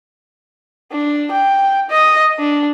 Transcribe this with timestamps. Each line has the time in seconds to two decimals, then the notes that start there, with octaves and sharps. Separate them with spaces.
0.91 D4
1.31 G5
1.90 D#5
2.39 D4